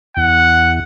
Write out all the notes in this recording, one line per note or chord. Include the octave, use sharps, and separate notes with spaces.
E2 F#5